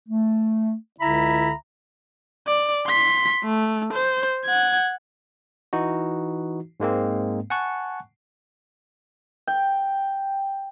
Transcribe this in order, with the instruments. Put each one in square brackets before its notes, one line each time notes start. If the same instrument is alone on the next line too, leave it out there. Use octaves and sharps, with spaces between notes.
[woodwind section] A3
C#2 D3 E4 E5 A#5 B5
[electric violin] D5
C6 B6
A3
C5
F#5 G#6
[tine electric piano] E3 D#4 F#4
G#2 G#3 A#3 C4
F#5 G#5 A5 C#6 F#6
[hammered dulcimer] G5